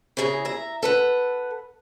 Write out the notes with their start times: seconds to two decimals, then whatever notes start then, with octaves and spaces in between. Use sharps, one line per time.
0.17 C#3 E4 G#4 G#5 A#5
0.45 E5 A#5
0.83 A4 B4 F#5